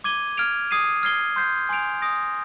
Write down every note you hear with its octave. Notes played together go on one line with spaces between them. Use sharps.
D6 G#6 D#7 G7
F6 G#6 D7 F7
D#6 G#6 C7 D#7
F6 G#6 C7 G7
C6 G6 C7
G#5 C6 G6 D7 F7
D#6 A#6 D7